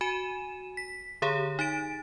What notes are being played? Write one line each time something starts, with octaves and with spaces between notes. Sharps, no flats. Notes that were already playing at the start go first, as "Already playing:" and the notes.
F#4 G#5 D#7 E7
B6
D3 G4 G#4 C#5
D#4 A6 D7